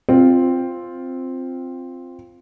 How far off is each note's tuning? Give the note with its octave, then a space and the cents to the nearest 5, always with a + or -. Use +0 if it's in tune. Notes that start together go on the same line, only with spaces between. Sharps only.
C4 +0 F4 +0